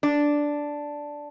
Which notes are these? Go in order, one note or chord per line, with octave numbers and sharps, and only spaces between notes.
D4